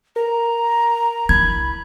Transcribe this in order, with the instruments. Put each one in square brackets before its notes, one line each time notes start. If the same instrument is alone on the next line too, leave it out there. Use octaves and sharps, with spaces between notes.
[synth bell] A#4 [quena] A#5
[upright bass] D4 E4 [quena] B5 [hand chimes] G#6